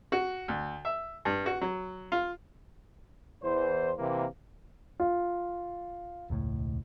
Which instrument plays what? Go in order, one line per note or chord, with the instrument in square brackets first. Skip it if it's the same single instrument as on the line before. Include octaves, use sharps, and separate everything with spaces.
[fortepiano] F#4
D2
E5
G2
F#4
F#3
F4
[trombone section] E2 E3 C5
C3 E3 A#3
[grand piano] F4
[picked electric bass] E1 C#2 A2